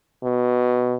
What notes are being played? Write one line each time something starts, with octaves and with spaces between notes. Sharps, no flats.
B2